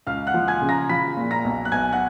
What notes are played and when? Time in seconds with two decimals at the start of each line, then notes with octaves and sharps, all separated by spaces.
0.07 C#2 F5 F6
0.27 F#5 F#6
0.34 F3
0.48 G#5 G#6
0.62 C#3
0.69 A#5 A#6
0.89 F3 B5 B6
1.17 A#2
1.31 A#5 A#6
1.45 B1
1.65 F#6
1.72 B1 G#5 G#6
1.93 F#5 F#6